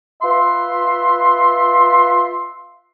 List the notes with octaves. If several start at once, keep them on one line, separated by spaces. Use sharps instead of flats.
F4 B4 E5 C6